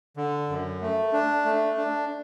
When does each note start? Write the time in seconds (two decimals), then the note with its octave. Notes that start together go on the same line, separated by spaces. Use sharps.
0.17 D3
0.49 F#2
0.82 A3
1.13 D4
1.45 A3
1.77 D4